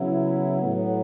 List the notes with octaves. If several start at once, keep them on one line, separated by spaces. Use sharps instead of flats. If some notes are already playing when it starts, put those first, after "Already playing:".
Already playing: C#3 F#3 B3 E4
A2 F#3 B3